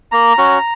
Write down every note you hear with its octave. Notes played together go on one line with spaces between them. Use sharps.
A#3 A#5
C#4 F#4